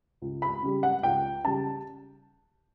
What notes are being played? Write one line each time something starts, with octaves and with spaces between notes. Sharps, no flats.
C#2
B5
C#3 G3
F#5
C#2 G5
C#3 G3 A5